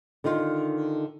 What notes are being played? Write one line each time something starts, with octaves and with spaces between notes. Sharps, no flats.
D3 D#3 D#4 F4